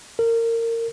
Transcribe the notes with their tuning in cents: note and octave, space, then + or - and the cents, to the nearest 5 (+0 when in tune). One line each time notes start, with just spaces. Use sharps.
A#4 -25